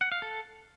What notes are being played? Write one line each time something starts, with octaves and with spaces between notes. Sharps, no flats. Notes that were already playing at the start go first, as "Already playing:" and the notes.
F#5
F5
A4